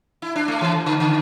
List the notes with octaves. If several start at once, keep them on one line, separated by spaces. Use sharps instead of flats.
E4
D4
A3
E3
D3
D3